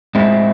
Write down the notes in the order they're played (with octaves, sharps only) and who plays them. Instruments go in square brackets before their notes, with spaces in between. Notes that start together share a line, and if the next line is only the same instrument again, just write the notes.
[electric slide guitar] A2 G#3 C4 E4